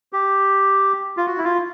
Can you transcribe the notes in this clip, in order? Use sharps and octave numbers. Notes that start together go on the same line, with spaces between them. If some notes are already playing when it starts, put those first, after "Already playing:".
G4
F4
F#4
E4
F4